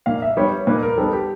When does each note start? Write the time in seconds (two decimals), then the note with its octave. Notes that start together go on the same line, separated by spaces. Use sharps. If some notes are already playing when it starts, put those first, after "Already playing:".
0.06 A#2 F5
0.22 E5
0.37 G3 B3 C#5
0.67 A#2 B4
0.83 A#4
0.98 G3 B3 A4
1.13 G4